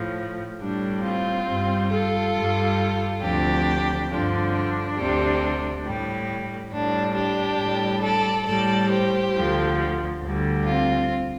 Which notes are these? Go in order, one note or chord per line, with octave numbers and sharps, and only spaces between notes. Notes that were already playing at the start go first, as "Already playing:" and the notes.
Already playing: A2 F3
A2 G3 D4
C4 F4
G2 G3
F4 A4
G2 G3
D2 C3 F3 D4 G4
G2 D3 F3 D4
D4
D2 C3 G3
A2 G3
A2 G3 D4
D4 G4
A2 G3
A4 D5
A2 G3 A4 D5
G4 C5
D2 D3 F3
D2 D3 G3
C4 F4